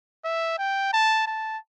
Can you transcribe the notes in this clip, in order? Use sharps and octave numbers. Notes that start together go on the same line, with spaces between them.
E5
G5
A5
A5